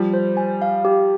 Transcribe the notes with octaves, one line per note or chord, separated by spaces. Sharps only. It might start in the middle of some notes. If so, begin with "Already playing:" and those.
Already playing: F3 G3
C5
G#5
F5
G4